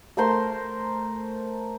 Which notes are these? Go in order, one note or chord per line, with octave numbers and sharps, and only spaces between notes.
A3 A#4 C5 C6